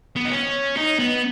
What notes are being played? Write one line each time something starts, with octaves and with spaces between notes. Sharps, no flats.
B3
D#4
C#4
D#4
B3